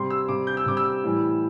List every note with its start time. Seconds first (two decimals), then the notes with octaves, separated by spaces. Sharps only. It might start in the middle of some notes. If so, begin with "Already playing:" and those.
Already playing: C3 G3 C6
0.10 E6
0.29 C3 G3 D6
0.47 G6
0.57 E6
0.66 C3 G3 D6
0.77 E6
1.04 A2 E3 G3